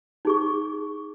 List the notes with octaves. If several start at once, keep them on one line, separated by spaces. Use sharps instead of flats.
D#4 G#4 C#6